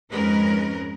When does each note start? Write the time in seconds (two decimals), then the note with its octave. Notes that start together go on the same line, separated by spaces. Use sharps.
0.10 F2 G#2 G#3 C#4 A#4 B4